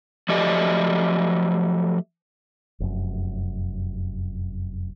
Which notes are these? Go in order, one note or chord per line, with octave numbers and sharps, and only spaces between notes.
F3 F#3 A3 G4 D5 D#5
F1 F#2